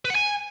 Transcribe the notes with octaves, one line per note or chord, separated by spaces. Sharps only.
B4
F#5
G#5